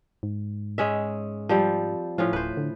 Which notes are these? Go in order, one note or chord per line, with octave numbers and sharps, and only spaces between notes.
G#2
G#3 C#4 E5
F3 G3 C4
A2 F3 C#4 F4
D1 B4 C5
D3